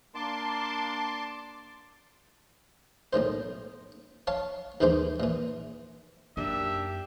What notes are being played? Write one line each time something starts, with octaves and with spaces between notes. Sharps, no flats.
A#3 D4 A5 C6 D6
B1 A2 D#3 C5
C#5 F5 A5
D#2 G#2 D#3 E3 C5 D6
A#2 E3
F#2 A#3 D4 D#4 G4 E5